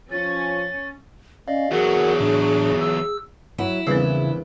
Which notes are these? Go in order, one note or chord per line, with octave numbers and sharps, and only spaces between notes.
F3 C#4 A6
C#4 D5 D#5 F5
E2 F#3 F#4 G#4 A#4 F#5
A2 D4
E6
F#3 E4 F#5
A#1 E2 C#3 G3 C4